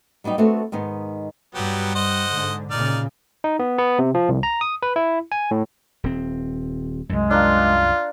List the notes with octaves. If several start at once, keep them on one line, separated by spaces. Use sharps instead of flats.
F#3 G3 B3 D#4 G4
A3 B3 C4 D4 F#4 A4
G#2 D#3 B3 D#4
G2 F#3 G3 B3 G4
C5 D#5 F#5
G#2 D3
A#2 C#3 D#4 D5 F6
D#4
B3
B3
C3
F3
C2
A#5
D#6
B4
E4
G#5
A2
D#1 C4
C2 F#2 G#3
D4 F4 A#4 F5